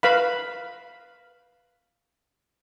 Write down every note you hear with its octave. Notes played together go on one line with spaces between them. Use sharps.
B4 F5 B5